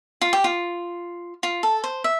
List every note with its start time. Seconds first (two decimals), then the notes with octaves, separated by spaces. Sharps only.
0.21 F4
0.33 G4
0.44 F4
1.43 F4
1.63 A4
1.84 C5
2.04 E5